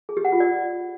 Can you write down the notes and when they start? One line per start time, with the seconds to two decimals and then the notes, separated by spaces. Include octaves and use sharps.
0.09 G#4
0.17 G4
0.25 F#5
0.32 F4
0.40 D5